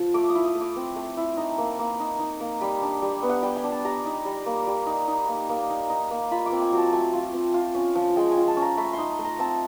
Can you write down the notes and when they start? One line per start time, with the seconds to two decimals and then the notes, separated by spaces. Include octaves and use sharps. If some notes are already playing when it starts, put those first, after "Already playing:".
Already playing: F3
0.14 A3 D6
0.29 D#6
0.35 E4
0.45 D#6
0.55 A3
0.61 D6
0.76 C4
0.96 A3
1.17 E4
1.37 D#4
1.58 A#3
1.79 A#3
2.00 D#4
2.19 D#4
2.40 A#3
2.61 G3 B5
2.82 D4
3.02 G3
3.23 B3
3.29 F#5
3.43 G3 G5
3.56 G#5
3.64 D4
3.71 A5
3.85 G3 A#5
4.06 D#4
4.25 G3
4.46 A#3
4.67 G3
4.87 D#4
5.08 D#4
5.28 A#3
5.49 A#3
5.70 D#4
5.90 D#4
6.11 A#3
6.31 F4 B5
6.46 D6
6.52 C4
6.62 G#5
6.72 F#3 A5
6.93 A3 G#5
7.13 F4
7.34 C4
7.54 F4
7.75 C#4
7.95 F3
8.16 G#3 G5
8.32 G#5
8.37 F4
8.48 A5
8.57 C#4
8.62 A#5
8.77 A3 B5
8.93 D#4 C6
9.19 A3
9.25 A#5
9.39 C4 A5